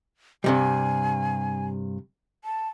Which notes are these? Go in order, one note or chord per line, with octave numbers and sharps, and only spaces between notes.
G2 C3 G3 G#5
A5